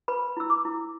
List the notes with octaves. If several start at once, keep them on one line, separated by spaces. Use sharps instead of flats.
B4 B5
E4 E6
D6
E4